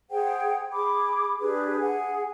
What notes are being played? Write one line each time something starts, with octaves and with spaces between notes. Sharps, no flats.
G#4 C5 F#5 G5
G#4 B5 D6
D4 G4 G#4 B4
G#4 F#5 G#5